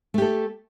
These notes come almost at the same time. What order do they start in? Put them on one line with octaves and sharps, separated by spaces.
A3 G4 A4